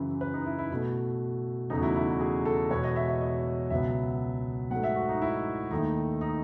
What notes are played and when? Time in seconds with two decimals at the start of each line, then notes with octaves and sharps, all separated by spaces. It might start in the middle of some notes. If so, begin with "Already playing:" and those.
Already playing: F#2 C#3 E3
0.21 B4
0.33 D#4
0.46 E4
0.58 E4
0.71 B2 A3
1.70 E2 C#3 F#3 A3 D#4
1.78 F#4
1.82 E4
1.96 E4
2.10 F#4
2.20 G#4
2.45 A4
2.70 E2 B2 G#3 B3 C#5
2.84 D#5
2.96 E5
3.08 E5
3.21 D#5
3.70 C#2 B2 F#3 B3 E5
4.71 G#2 F#3 A3 F#5
4.83 E5
4.96 F#4
5.09 D#4
5.22 E4
5.71 D#2 D#3 A3 D#4
6.21 D#4